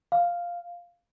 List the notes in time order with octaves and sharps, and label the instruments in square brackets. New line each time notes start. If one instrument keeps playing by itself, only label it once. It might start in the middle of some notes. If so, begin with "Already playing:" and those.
[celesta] F5